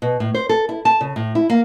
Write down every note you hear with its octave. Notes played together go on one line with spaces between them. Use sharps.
B2
A2
C5
A4
E4
A5
C#3
A2
E4
A#3